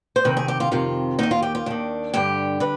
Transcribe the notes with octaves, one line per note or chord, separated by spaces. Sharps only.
C5
F2 C3 D#3 B4
G#4
G4
F4
F2 C3 D#3 F4
D#2 D#3 D#4
F4
G4
F4
D#2 D#3 D4
G2 D3 G4
D3 B4